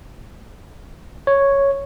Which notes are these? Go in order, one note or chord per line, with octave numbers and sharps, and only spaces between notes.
C#5